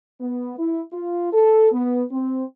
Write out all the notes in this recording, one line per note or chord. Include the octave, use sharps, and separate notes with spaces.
B3
E4
F4
A4
B3
C4